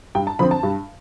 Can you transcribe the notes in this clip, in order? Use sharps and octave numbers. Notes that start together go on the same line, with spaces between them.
G2 G5
A5
D3 F3 C4 B5
A5
G2